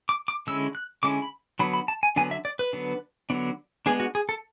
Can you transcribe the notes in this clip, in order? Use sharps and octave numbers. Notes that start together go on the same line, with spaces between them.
D6
D6
D3 G#3 C#4 E4 E6
F#6
D3 G#3 C#4 E4 D6
B5
D3 F#3 B3 D4 B5
B5
A5
G#5
D3 F#3 B3 D4 G#5
E5
D5
B4
D3 F#3 B3 D4
D3 F#3 B3 D4
G#3 B3 D4 G#4
F#4
G#4
A4